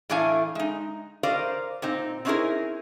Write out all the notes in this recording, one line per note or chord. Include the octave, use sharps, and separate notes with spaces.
A2 E3 A3 D4 F5 G#5
G#3 D#4
G4 A#4 C5 D5 D#5 F5
A#2 C4 D#4
C4 C#4 D#4 E4 G#4 A#4